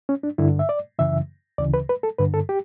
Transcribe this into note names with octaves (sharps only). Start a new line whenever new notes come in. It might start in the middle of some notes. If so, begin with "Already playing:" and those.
C#4
D4
G2 D3 E4
E5
D5
F#2 C#3 E3 E5
D2 C#3 E3 D5
B4
B4
A4
G2 D3 B4
A4
G4